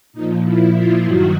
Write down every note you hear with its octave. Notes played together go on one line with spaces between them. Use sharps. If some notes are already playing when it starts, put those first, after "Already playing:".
A#2 F3 D#4
E4
F4
G2 D#3 F#3 F#4